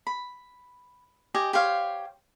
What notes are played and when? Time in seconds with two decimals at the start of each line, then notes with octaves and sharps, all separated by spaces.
0.07 B5
1.35 G4 D#5 G#5
1.53 G4 C5 C#5 F5